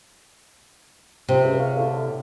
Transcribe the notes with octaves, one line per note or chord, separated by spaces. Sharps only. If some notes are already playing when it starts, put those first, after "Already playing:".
C3 F3 C4
C#2 G2
C#5 F5
A2 D3